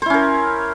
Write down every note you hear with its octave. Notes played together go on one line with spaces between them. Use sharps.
C#4 E4 A#4 C5